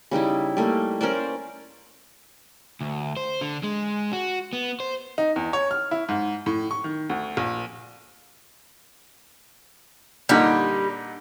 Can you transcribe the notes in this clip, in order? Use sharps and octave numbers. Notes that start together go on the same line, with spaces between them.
C#3 G3 D#4 E4
G3 A3 A#3
C#4 A#4 C5 D5
D2
C5
D3
G#3
F#4
B3
C5
D#4
E2
C#5
F6
E4
G#2
A2
C#6
D#3
D2
A#1
A#2 D3 G3 D#4